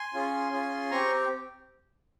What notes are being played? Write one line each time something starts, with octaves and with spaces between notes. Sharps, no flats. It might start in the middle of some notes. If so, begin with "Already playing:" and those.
Already playing: G#5 C6
C#4 F4 G#4
C#4 F4 G#4
C4 G4 A#5 C#6